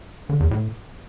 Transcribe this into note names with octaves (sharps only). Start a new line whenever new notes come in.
D3
E2
A2